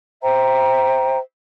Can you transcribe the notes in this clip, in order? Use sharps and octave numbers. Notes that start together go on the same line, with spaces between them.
C5 E5 G5 A#5